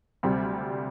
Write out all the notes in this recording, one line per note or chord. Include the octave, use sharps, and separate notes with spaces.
D2 C3 G3 C4 G4